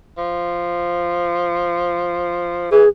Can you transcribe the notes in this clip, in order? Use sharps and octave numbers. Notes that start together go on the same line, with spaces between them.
F3
E3 G#4